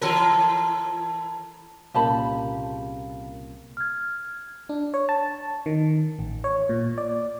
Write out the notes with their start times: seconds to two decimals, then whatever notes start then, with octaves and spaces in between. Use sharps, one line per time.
0.01 E3 A4 A#4
1.94 C2 A#2 C#3 G4 A#4 F5 A5 B5
3.77 F6 G#6
4.69 D4
4.94 C#5
5.09 A5
5.66 D#3
6.19 A1
6.44 C#5
6.69 A#2
6.98 D5